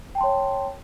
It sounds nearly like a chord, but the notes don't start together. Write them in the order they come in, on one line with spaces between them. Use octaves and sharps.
G5 A5 C6 C#5